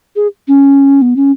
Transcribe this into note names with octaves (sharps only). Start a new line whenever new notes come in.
G#4
C#4
B3
C#4